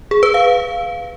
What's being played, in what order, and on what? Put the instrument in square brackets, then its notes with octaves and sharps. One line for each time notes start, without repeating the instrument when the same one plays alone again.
[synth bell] G#4
B4
F5